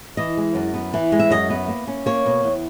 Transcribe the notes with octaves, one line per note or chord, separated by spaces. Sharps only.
E3 D#5
G#3
F#2
B3
E3
G#3
E5
F#2 D#5
B3
A#3
C#4
A#3 C#5
B2
E2